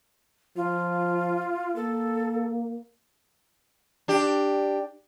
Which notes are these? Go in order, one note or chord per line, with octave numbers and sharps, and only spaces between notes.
F3 F4
A#3 A4
D4 G4